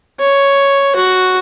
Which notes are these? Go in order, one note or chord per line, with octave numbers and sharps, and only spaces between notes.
C#5
F#4